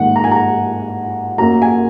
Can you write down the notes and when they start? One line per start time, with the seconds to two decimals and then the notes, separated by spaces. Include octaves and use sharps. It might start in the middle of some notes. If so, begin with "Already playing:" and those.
Already playing: G#2 D#3 A#3 F#5
0.16 A#5
0.24 G#5
0.31 A#5
1.38 F#2 F#3 A#3 A#5
1.62 G#5